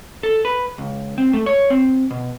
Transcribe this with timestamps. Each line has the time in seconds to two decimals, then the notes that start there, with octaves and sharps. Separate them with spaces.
0.23 A4
0.45 B4
0.78 C#2
1.18 C4
1.33 A3
1.46 C#5
1.70 C4
2.10 B2